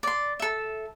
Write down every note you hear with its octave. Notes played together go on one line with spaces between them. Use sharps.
D5 C6
A4 E5